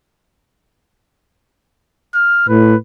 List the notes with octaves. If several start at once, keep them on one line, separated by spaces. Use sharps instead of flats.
F6
A2 B4